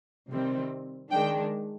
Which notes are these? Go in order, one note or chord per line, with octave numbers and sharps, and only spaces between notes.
C3 D#3 G3 C4
D#3 G#3 D4 G5